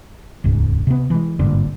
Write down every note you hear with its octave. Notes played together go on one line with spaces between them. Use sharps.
D#1 C#2 G#2
C3 B3
E3 G#3
G#1 G2 A#2 D3